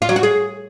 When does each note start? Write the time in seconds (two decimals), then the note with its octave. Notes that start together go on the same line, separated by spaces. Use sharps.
0.02 F4
0.09 F#3
0.16 F#4
0.23 G#4